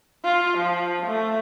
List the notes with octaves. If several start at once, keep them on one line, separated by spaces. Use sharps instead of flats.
F4
F3
A3